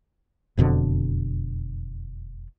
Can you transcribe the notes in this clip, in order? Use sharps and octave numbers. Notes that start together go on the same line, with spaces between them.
E1 F2 B2 D3